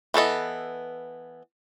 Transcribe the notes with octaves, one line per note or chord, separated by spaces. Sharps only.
E3 B3 A4 D#5